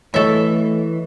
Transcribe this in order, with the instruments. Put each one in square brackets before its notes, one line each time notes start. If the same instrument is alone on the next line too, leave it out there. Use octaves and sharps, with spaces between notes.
[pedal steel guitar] E3 [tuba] A3 [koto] A4 E5 [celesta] C#5 D#5 C#6